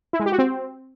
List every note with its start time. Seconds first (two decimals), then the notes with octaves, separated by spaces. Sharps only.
0.13 E4
0.20 G#3
0.26 G4
0.32 F#4
0.39 C4